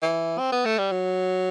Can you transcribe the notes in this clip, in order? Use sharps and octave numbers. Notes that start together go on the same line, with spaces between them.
E3
C4
B3
A3
G3
F#3